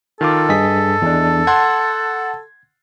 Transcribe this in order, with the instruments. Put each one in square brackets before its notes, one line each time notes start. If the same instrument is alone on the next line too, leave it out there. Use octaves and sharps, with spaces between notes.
[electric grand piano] D#3 F4 D6 [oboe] A4
[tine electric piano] G2 G#4 B6 [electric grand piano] D#5
[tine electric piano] E2 D4
[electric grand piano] F#5 A5 C6 [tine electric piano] G#6